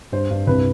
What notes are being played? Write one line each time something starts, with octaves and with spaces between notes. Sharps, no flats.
G2 C5
G2
C2 B4